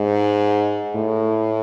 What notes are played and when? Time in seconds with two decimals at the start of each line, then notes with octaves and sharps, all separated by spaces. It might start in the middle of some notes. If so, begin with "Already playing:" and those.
Already playing: G#2
0.96 A2